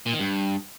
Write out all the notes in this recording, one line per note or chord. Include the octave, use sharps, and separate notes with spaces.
A#2
D#3
G2